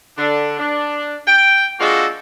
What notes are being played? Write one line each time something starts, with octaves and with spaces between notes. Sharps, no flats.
D3 D4
D4
G5
G#3 A#3 D4 F4 F#4 A4